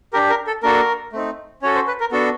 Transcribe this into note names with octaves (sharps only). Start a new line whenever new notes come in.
D4 G4 A#4
A#4
A4
A#3 D4 F#4 A4 A#4
A3 C4 D#4
C#4 F#4 A4 C#5
C5
B4
A#4
B3 D4 F#4 A4